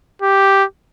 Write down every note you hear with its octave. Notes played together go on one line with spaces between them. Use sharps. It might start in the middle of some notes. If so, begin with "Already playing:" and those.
G4